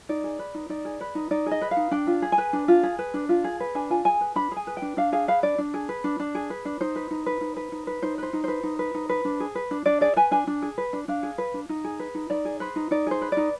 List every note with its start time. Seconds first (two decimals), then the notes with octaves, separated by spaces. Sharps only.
0.09 D#4 D5
0.24 G#4
0.39 B4
0.54 D#4
0.69 D#4 D5
0.85 G#4
1.01 B4
1.15 D#4
1.31 D#4 D5
1.46 G#4
1.51 D#5
1.61 B4
1.71 F5
1.77 D#4
1.91 D4 G5
2.07 F4
2.22 G#4
2.32 G#5
2.38 B4
2.53 D4
2.68 F4
2.83 G#4
2.99 B4
3.14 D4
3.29 F4
3.44 G#4
3.60 B4
3.75 D4 G#5
3.90 F4 G#5
4.05 G#4 G#5
4.21 B4
4.36 D4 B5
4.52 G#4 G#5
4.67 B4
4.77 G5
4.82 D4
4.97 D4 F5
5.12 G#4 F5
5.28 B4 F5
5.43 D4 D5
5.58 D4
5.74 G#4
5.89 B4
6.04 D4
6.20 D4
6.35 G#4
6.50 B4
6.65 D4
6.81 D#4 C5
6.96 B4
7.11 D#4
7.26 B4
7.41 D#4
7.56 B4
7.72 D#4
7.87 B4
8.02 D#4 C5
8.18 B4 C5
8.33 D#4
8.44 B4 C5
8.63 D#4
8.79 B4
8.95 D#4
9.09 B4
9.25 D4
9.40 G#4
9.55 B4
9.71 D4
9.86 D4 D5
10.01 G#4 D5
10.16 B4 G#5
10.31 D4 G#5
10.47 D4
10.62 G#4
10.78 B4
10.93 D4
11.08 D4 F5
11.23 G#4
11.38 B4
11.54 D4
11.69 D#4
11.84 G#4
11.99 B4
12.15 D#4
12.30 D#4 D5
12.45 G#4
12.60 B4 C5
12.76 D#4
12.91 D#4 D5
13.06 G#4 C5
13.22 B4
13.32 D#4 D5